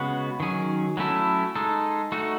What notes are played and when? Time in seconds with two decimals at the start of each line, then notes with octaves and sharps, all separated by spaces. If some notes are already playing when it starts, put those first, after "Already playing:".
Already playing: C#3 G#3 B3 F#4
0.40 D#3 F#3 C#4 G#4
0.97 F#3 A3 C#4 E4 A4
1.55 G#3 D#4 A4
2.12 A3 D#4 F#4